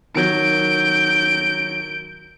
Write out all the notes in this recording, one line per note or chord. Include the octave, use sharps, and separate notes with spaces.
D#3 F#3 G6 D7